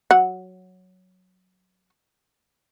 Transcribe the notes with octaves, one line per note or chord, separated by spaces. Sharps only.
F#3 F#5